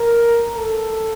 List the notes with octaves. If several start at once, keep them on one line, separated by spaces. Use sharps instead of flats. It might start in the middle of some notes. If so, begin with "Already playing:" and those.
Already playing: A#4
A4